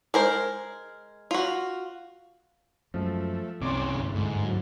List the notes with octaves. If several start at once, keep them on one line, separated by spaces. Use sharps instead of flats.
G#3 A#4 C5
F4 F#4
F#2 F3 G#3 A3
F#1 C2 C3 C#4 C#5 D5 C6 D6
D2 G2
G#2 D3 G#3
F#3